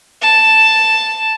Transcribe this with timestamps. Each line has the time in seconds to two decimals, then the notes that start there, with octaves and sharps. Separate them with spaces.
0.22 A5